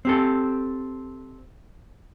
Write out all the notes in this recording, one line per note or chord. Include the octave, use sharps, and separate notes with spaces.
C4 G4 A4